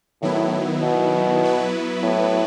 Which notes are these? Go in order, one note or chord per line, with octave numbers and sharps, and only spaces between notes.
A2 D#3 F#3 B3 E4
B2
F#3 B3 E4 B4
A2